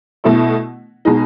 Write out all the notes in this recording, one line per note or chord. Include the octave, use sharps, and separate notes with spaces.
B2 A3 E4
B2 G#3 D#4